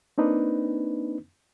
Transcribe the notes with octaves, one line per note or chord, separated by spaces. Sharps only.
A#3 C4 D4 D#4 B4